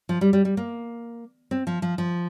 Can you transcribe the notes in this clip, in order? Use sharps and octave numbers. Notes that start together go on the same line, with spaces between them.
F3
G3
G3
G3
A#3
C4
F3
F3
F3